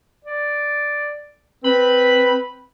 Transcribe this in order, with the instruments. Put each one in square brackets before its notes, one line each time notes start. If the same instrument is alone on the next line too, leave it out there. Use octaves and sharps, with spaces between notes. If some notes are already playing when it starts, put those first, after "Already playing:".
[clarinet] D5
[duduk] C4 [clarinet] B4 [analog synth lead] B5